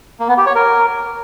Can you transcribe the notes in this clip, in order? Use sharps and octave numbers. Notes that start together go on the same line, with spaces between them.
A#3
B3
G4
C#5
A#4